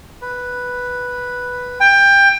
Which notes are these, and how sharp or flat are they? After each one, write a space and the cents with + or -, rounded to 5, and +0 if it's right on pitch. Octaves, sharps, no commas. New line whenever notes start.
B4 +0
G5 +20